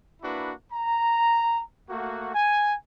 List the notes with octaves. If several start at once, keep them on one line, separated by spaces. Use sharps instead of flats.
A#3 D4 E4 F#4 B4
A#5
A3 A#3 F#4
G#5